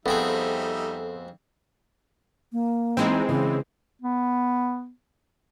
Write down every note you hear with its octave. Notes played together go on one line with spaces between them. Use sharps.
F2 G3 B3 C4 D#4 G#4 A4 E5
A#3
E3 G#3 C4 D#4
C#3 E3
B3